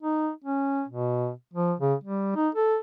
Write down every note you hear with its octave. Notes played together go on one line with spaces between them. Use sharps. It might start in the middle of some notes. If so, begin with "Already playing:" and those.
D#4
C#4
B2
F3
C#3
G3
D#4
A4